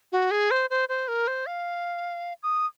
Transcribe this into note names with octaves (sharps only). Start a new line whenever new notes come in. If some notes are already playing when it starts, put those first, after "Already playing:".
F#4
G#4
C5
C5
C5
A#4
C5
F5
D#6